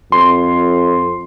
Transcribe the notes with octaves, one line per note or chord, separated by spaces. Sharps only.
F2 C6